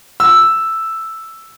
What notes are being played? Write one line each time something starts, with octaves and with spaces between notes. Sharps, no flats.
E6